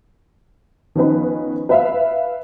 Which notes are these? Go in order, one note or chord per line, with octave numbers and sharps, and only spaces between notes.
D#3 F3 B3 C#4 D#4 B4
B4 E5 F5